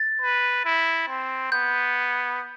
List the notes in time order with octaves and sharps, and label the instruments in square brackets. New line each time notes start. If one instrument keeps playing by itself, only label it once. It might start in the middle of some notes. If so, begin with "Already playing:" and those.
Already playing: [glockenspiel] A6
[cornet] B4
E4
C4
[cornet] B3 [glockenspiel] G6